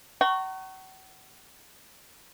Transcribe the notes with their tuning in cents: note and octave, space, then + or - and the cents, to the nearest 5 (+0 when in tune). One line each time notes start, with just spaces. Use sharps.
F#5 +40 A#5 -20 C#6 +0